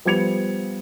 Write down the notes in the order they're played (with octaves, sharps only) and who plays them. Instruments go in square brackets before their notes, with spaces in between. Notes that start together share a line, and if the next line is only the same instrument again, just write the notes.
[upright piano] F3 G3 B3 G#6 C#7 F7